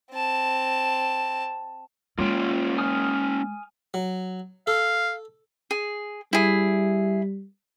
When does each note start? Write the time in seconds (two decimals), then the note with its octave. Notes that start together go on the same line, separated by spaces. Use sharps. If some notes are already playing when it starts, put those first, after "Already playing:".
0.11 C4 A5
2.18 G#3 A#3 C#4 F4 G5
2.78 G#5 D#6 F6
3.94 F#3
4.67 A4 F5
5.71 G#4
6.33 G3 E4 G#4